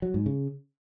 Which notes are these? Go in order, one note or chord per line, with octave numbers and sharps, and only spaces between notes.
F#3
G#2
C#3